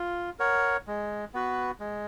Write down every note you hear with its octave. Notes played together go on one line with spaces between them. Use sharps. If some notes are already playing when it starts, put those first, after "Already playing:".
Already playing: F4
A#4 C#5 F#5
G#3
B3 F#4 B4
G#3